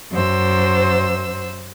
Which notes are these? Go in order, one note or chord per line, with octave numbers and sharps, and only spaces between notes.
F#2 C5 E6